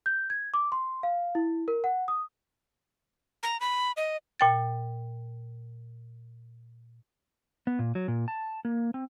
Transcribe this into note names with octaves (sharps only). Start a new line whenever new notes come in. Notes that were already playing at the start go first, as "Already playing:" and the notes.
G6
G#6
D6
C6
F5
E4
A#4
F#5
D#6
A#5
B5
D#5
A#2 G5 A6
B3
A#2
F#3
A#2
A5
A#3
C4